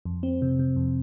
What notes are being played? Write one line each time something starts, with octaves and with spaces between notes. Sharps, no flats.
F2
C4
C3
C3
F2